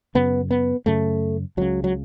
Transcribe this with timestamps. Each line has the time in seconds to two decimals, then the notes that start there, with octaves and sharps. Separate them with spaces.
0.15 F#2 C#3 B3
0.51 B3
0.86 F#2 C#3 A3
1.57 C#2 C#3 F#3
1.84 F#3